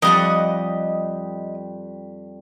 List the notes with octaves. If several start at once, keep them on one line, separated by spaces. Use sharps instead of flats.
F2 G3 D#5 F#5